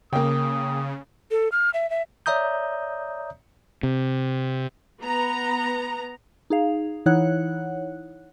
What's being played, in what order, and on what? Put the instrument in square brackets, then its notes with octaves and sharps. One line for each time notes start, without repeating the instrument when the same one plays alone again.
[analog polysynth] C#3 [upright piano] A#3 G5 [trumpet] D#6
[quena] A4
F6
E5
E5
[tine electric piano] C#5 D5 E5 A#5 D#6 G6
[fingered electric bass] C3
[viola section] B3 A#5
[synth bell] D#4 G#4 F5
E3 D#4 E4 C#5 F#5 F#6